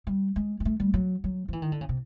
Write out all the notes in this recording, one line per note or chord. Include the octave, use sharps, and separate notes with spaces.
G3
G#3
G#3
A3
G3
F#3
F#3
F3
E3
D#3
D3
C#3
C3